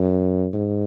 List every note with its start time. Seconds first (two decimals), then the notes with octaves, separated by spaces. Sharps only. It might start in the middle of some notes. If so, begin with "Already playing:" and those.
Already playing: F#2
0.54 G#2